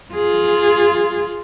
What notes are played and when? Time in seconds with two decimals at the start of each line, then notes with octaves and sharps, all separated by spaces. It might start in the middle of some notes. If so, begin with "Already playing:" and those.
0.14 F4 G#4